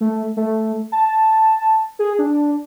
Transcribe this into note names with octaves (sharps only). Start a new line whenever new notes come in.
A3
A3
A5
G#4
D4